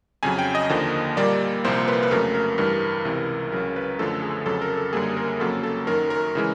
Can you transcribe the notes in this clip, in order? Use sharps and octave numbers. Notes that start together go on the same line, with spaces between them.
F2 C#3 F#3 G#5
G5
D#5
D#2 D3 F3 A#3
A#2 G3 A#3 D5
C2 A#2 F3 A#3 C5
B4
B4
F2 C#3 F#3 A3 A#4
A#4
G2 E3 G3 A#4
C#2 C3 E3
C#2 C#3 F#3 A#4
B4
F#2 D3 F3 A3 A4
G#4
F2 C#3 F#3 A4
A#4
A4
F#2 D3 G3 A#3 G#4
A#4
F2 C#3 F#3 A#3 A4
A4
F#2 D#3 F#3 A#4
A#4
C#3 E3 G#3